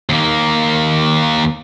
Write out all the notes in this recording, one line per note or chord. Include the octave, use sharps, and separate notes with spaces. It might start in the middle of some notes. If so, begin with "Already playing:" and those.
D#2 A#3